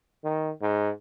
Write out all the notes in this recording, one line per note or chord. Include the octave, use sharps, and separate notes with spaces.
D#3
G#2